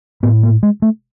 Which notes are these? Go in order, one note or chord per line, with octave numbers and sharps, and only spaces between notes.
A2 B3
A#3
G#3
A3